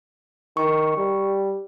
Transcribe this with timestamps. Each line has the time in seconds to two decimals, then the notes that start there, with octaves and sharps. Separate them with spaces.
0.57 D#3 C#6
0.97 G3